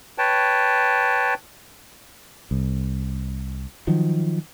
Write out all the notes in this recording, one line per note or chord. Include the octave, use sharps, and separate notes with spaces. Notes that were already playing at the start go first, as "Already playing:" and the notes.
B4 C#5 G5 A5
C2
D#3 F3 F#3